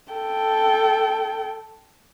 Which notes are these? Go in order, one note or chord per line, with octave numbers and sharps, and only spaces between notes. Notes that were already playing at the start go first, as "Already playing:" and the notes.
A4 G5